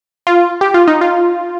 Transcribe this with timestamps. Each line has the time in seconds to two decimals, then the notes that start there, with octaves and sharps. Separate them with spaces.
0.27 F4
0.61 G4
0.74 F4
0.88 D#4
1.01 F4